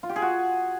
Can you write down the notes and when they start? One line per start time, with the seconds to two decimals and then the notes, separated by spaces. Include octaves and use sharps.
0.03 F4
0.09 G4
0.16 G#4
0.22 F#4